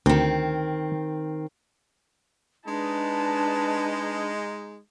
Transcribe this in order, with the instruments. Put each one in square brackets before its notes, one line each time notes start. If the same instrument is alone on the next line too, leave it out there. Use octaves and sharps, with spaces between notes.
[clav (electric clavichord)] D2 [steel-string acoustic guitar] D#3 C4
[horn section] G#3 D#4 [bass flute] D4 [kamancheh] B4 A5